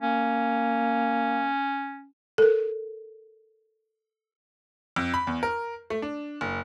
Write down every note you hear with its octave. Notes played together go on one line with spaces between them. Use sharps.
A#3 C#4
A4 A#4
F2
B5
E2
A#4
A3
D4
F#1